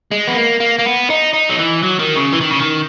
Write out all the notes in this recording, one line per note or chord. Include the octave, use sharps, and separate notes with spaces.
G#3
B3
A#3
A#3
A#3
B3
D#4
D#4
F#3
E3
F#3
D#3
C#3
E3
D#3
C#3
D#3